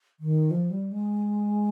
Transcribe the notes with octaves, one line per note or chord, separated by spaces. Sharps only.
D#3
F3
G3
G#3